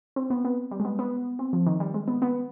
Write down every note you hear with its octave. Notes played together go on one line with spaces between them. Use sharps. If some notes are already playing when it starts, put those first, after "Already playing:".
C4
B3
B3
G3
G#3
B3
B3
C4
F3
D#3
G3
G#3
B3
B3